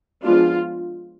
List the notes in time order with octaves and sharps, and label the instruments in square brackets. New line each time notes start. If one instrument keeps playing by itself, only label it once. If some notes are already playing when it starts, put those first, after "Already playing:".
[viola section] F3 G#3 B3 D4 F4